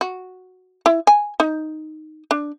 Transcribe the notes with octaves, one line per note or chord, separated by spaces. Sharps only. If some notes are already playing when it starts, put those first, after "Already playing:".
F#4
E4
G#5
D#4
D4